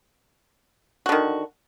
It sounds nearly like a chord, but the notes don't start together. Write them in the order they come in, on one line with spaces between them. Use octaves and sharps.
F#4 D3 D#3